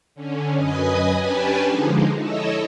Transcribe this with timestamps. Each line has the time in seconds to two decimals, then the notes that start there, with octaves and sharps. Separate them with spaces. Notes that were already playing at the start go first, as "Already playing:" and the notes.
0.15 D3 C#4
0.54 F#2 B4 D#5 G#5 D#6
1.19 C#4 D4 G4 B4 G#5 A5
1.67 D3 F3 G#3 D#4
2.18 E4 A4 C#5 D#5 E5